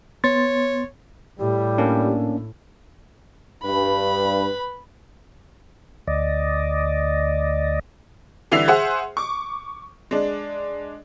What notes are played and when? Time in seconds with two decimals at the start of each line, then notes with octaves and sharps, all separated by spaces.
0.24 B3 C#5 C6 A6
1.39 A2 G3 G4
1.78 A#3 C#4 D4
3.64 G2 B4 B5
6.07 D2 D5 D#5
8.51 D3 E3 G3 E5 C7 F7
8.68 G#4 C5 E5 F#5 C6
9.17 C#6 D6
10.11 G#3 D4